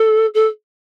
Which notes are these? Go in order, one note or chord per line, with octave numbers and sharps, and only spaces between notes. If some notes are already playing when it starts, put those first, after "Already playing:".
Already playing: A4
A4